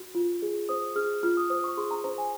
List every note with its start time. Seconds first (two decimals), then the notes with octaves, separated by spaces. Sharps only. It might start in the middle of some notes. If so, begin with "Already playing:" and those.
Already playing: F#4
0.15 F4
0.42 G#4
0.69 C5 D#6
0.96 G#4 F6
1.23 F4 F6
1.37 D#6
1.50 C5 D#6
1.64 C#6
1.77 G#4 C6
1.91 A#5
2.04 C5 A#5
2.18 G#5